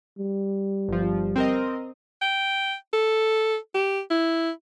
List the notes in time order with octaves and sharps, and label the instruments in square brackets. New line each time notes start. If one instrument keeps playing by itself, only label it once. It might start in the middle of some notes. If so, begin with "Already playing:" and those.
[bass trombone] G3
[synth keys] G1 F3
C4 A#4 D#5
[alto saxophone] G5
A4
G4
E4